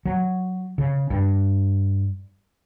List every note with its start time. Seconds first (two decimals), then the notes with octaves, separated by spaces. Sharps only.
0.05 F#3
0.78 C#3
1.10 G2